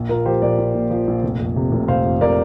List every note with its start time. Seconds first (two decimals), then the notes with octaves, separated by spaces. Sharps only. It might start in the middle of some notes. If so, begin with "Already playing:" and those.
Already playing: A#1
0.09 A#2 F4 A#4
0.25 F3 G4 C5
0.42 A#1 A#4 D5
0.58 A#1
0.74 A#2
0.91 F3
1.07 A#1
1.23 F1
1.40 F2
1.56 C3
1.72 F1
1.88 F1 C5 F5
2.05 F2
2.21 C3 A#4 D5